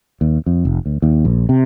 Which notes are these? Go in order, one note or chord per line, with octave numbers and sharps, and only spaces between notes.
D#2
F2
F1
D2
D#2
A#1
C3